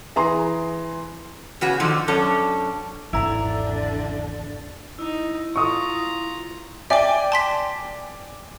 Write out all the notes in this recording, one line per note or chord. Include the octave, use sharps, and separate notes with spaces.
E3 G#4 A#5 C6
C#3 B3 F#4 G#4
D3 D#3 F3
F#2 C#4 D4 A4
G#1 E2 D3 D4 E4 A#5
D#4 E4
F4 A#5 C#6 D#6
D5 E5 G5 G#5 D6
A5 C6 B6